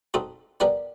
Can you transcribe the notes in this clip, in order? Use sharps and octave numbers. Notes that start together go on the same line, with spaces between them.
C4 D#4 F#4 A4
B3 D4 G4 A#4 D5